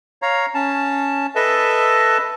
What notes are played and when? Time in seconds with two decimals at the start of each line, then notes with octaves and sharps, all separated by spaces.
0.22 C#5 F5 A#5
0.54 C#4 A5
1.35 A4 B4 D#5 E5 A5